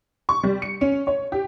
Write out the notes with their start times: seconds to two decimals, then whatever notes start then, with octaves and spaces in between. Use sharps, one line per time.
0.29 C#6
0.43 G3
0.62 C#7
0.81 C#4
1.07 C#5
1.32 G4